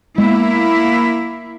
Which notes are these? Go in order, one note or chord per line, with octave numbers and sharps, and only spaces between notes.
G#3 A#3 B3 E4